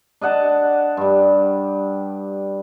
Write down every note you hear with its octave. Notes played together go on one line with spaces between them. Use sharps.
D4 D#5 F#5 A5
G2 G3